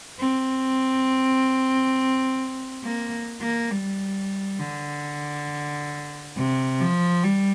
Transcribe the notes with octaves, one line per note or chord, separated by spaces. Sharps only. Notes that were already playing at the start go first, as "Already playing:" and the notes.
C4
A#3
A#3
G3
D3
C3
F3
G3